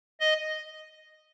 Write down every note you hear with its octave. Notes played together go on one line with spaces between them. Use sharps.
D#5